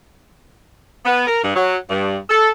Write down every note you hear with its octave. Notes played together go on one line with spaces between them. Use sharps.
B3
A#4
G2
F#3
G2
A4